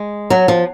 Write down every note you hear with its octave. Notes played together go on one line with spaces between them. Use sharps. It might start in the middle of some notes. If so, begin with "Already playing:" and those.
Already playing: G#3
F#3
F3